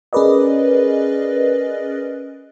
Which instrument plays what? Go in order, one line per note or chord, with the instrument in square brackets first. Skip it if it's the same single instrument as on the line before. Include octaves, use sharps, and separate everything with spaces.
[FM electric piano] C#4 G#4 A#4 B4 D5 D#5